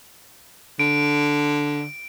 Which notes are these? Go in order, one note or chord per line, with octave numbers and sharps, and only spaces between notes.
D3 D7